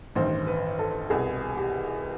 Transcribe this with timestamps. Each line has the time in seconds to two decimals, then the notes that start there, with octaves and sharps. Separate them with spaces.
0.15 A1 G2 D#3 C5
0.47 B4
0.79 A4
1.10 C2 B2 G#4
1.57 G4